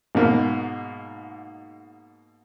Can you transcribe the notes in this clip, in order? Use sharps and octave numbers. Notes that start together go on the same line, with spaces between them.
G#2 B2 A#3